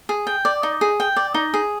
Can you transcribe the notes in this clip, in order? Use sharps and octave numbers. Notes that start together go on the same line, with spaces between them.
G#4
G5
D5
D#4
G#4
G5
D5
D#4
G#4